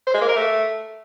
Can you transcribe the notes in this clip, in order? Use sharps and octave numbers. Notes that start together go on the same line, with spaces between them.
C5
G#3
A#3
A#4
A3